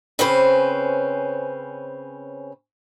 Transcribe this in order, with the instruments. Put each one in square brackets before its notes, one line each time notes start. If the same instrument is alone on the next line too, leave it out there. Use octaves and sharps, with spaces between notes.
[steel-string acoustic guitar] C#3 C4 C#4 B4 C5